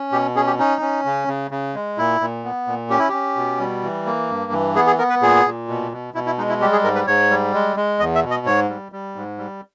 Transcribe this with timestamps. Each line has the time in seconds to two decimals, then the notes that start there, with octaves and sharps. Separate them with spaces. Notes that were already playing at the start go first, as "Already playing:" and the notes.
Already playing: C#4
0.12 B2 G4
0.36 C#4 G#4
0.47 G4
0.59 C#4 D#4
0.81 C#4
1.05 C#3
1.28 C#3
1.51 C#3
1.75 G#3
1.98 A#2 E4
2.21 A#2
2.44 B3
2.67 A#2
2.90 C#4 G4
2.99 E4
3.09 C#4 G4
3.37 B2
3.59 G3
3.83 E3
4.06 A#3
4.29 G2
4.52 E3
4.76 B3 G#4
4.87 G#4
4.98 B3 A#4
5.10 B4
5.22 A#2 G#4
5.45 A#2
5.68 B2
5.91 B2
6.14 B2 E4
6.26 E4
6.38 G#3 D#4
6.49 E4
6.61 G3 G4
6.72 G#4
6.84 G#2 A#4
6.95 B4
7.07 G#2 C#5
7.30 G3
7.54 G#3
7.77 G#3
8.00 E2 D#5
8.15 E5
8.23 B2
8.31 D#5
8.46 G#2 C#5
8.69 G3
8.92 G3
9.15 G#2
9.38 G3